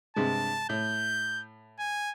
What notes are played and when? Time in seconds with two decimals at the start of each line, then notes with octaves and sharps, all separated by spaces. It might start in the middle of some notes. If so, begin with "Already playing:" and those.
0.16 G2 C3 G#3 A5
0.69 A2 G6
1.79 G#5